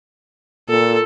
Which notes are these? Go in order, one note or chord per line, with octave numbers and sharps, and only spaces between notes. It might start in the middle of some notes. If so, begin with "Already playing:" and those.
A#2 A4